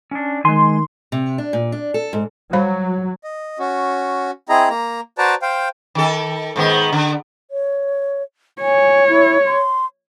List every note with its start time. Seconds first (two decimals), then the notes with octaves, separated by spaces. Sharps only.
0.11 C#4 D4
0.45 D#3 G#3 G#5 C6
1.12 C3
1.38 D4
1.53 A#2
1.72 D4
1.94 A4
2.13 G#2
2.53 F#3 G3 C5 B5
3.23 D#5
3.59 C#4 F#4
4.49 C4 E4 G#4 D#5 A#5
4.70 A#3 A#5
5.18 F#4 B4 C5 D5 A5 A#5
5.42 C5 F5 G5
5.95 D#3 A4
6.56 G#2 D#3 B3
6.92 D3
7.51 C#5
8.61 C#5 G#5
9.08 E4
9.46 C6